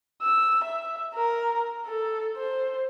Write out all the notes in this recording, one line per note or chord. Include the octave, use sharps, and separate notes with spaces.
E6
E5
A#4
A4
C5